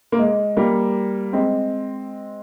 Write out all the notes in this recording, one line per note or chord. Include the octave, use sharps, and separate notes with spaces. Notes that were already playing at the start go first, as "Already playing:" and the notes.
A#3
G#3
G3 A#3
G#3 C4